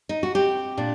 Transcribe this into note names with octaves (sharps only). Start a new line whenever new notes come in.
D#4
F#4
C4 G4
A#2 D4